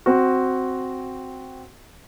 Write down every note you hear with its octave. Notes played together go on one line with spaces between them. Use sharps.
C4 F#4